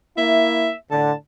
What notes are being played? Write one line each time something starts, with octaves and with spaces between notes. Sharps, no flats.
A#3 E4 E5
A2 D3 A5